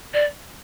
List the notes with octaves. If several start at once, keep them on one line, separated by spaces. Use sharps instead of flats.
D5